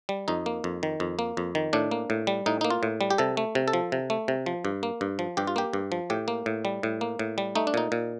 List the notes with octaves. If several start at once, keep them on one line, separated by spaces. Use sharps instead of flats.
G3
F2 D#4
A#3
F2
D#3
F2
A#3
F2
D#3
A2 D4
A#3
A2
G3
A2 D#4
A#3 D#4
F4
A2
G3
G4
C3 A4
A3
C3
A4
F3
C3
A3
C3
F3
G2
A#3
G2
F3
G2 G4
F4
A#3 G4
G2
F3
A2 G4
A#3
A2
G3
A2
A#3
A2
G3
A3 D#4
D4
A#2 D#4
A#2